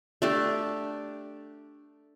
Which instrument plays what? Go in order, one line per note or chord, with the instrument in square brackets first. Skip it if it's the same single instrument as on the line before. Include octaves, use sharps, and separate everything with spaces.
[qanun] A3 D4 G4